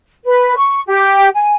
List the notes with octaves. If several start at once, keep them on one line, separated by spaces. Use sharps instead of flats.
B4
C#6
G4
G#5